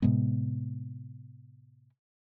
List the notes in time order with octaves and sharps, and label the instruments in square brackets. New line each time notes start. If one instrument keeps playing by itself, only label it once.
[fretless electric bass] A2 C3 G#3 B3